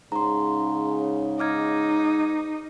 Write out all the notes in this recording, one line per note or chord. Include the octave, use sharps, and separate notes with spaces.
G#2 C#3 A#5 C6
D#4 D6 F6 G#6